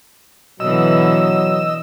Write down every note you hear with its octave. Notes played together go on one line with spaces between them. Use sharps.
B2 D3 E3 F#3 D#5 E6